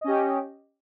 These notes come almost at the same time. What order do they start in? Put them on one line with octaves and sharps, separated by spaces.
D#5 C#4 G4